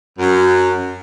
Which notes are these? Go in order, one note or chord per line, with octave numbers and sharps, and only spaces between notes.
F#2